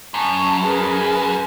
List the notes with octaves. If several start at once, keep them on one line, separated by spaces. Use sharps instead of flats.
F#2 G#5 A5 C#6
G#4 A#4 B4